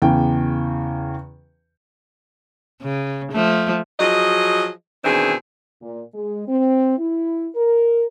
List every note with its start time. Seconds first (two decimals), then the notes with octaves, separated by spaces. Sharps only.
0.02 E2 C#3 G5
2.82 C#3
3.32 F3 A3
3.99 F3 F#3 G#4 D#5
5.05 B2 D#3 E3 C4 D4 G#4
5.82 A#2
6.14 G#3
6.48 C4
6.98 E4
7.55 A#4